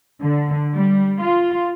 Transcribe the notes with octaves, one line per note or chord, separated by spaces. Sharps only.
D3
G3
F4